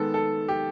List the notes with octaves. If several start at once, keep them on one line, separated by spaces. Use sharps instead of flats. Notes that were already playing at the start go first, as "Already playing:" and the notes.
Already playing: D#3 G#3 B3 A4
A4
G4